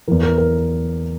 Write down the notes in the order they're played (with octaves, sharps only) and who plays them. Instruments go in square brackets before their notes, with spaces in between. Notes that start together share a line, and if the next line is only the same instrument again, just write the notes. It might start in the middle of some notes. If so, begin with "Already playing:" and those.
[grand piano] E2 E3 A#4
A#4
A#4